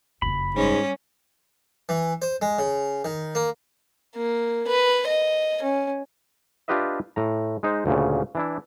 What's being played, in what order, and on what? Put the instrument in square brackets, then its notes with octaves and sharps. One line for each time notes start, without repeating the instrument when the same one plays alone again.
[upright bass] F#1 F2 [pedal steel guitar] B5
[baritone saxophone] G#2 [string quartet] G3 C#4
[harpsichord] E3
C5
G#3
C#3
D#3
A#3
[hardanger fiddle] A#3
B4
D#5
C#4
[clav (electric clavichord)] D4 F4 G4 B4 D#5 E5
A2 A#5
G#3 D#4 C5
D2 A#2 C#3
E3 D4 E4